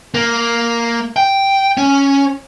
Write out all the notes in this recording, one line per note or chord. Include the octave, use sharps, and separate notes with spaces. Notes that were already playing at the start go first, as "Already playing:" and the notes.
A#3
G5
C#4